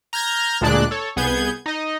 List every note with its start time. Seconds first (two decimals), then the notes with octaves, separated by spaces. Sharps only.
0.13 A#5 F6 G6 G#6 A#6
0.61 D2 A#2 G#3 D4 D5 F#6
0.91 A4 C#5
1.16 C2 B3 G#4 G6 G#6
1.66 D#4 D#5